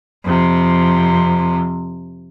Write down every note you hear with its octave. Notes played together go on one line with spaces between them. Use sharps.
F2 C3